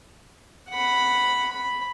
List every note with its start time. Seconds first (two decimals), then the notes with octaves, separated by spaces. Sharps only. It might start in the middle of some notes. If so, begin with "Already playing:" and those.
0.70 F#5 B5
1.51 B5